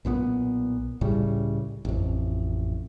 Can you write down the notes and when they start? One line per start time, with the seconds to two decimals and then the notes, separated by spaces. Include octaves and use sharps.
0.05 B1 A#2 G3 B3
1.01 C#2 A2 C#3 G3
1.85 A1 F2